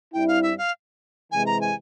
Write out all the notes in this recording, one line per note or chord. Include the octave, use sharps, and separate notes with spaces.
G2 G3 C4 E4 G5
F5
E5
F5
C3 E3 G#3 G#5
A#5
G#5